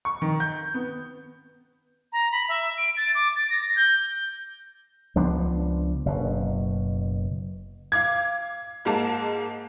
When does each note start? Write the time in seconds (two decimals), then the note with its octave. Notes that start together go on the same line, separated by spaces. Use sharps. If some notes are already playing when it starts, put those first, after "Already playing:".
0.05 C#6
0.22 D#3
0.40 G6
0.74 B3
2.13 A#5
2.32 B5
2.49 E5
2.78 D7
2.97 A6
3.15 D6
3.36 A6
3.50 A#6
3.76 G6
5.15 C#2 F3 B3 D4
6.06 F#1 B2
7.92 F5 D6 G#6
8.85 G#2 G#3 A#3 A5